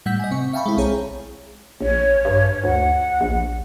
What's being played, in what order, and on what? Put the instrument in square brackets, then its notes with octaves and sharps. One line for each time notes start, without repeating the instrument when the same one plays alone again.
[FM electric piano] A2 G3 F#5 E6 G6 B6
D#5 G#5
C3 C4 C#6
E5 F5 G5 A5 B5 C#6
G#3 C4 E4
B1 C4 G#4 C#5 A#5
[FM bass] A#1 [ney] C#5
[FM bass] G2
[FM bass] D2 [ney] F#5
[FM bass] A#1